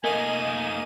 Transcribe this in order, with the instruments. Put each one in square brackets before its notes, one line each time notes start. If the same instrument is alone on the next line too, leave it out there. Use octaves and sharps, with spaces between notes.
[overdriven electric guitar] A3 D#4 [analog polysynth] A#3 D#5 D#7 [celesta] A#4 [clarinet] G#5